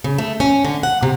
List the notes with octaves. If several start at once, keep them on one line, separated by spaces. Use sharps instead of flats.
C#3
A3
C#4
D3
F#5
C3